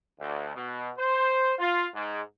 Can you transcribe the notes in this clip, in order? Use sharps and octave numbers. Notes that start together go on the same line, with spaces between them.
D2
B2
C5
F4
G#2